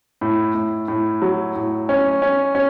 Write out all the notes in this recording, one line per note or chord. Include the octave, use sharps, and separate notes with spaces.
A2
A2
A2
F#3
A2
C#4
C#4
C#4